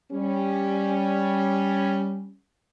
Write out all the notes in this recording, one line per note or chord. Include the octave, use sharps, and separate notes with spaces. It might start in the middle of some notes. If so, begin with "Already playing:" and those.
G3 C#4